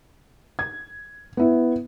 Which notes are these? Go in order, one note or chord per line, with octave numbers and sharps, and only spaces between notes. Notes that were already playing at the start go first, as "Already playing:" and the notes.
G#6
B3 E4